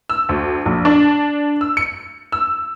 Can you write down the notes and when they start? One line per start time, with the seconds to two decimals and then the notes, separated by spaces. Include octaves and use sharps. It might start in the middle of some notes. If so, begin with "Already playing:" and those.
0.09 E6
0.29 D2
0.66 A#1
0.85 D4
1.61 E6
1.77 C#7
2.32 E6